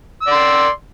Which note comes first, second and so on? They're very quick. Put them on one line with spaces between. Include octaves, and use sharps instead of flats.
E6 D5 C6